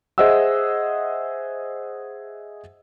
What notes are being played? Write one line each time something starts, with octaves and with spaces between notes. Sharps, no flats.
G#4 C5 D#5 E5 F#5 E6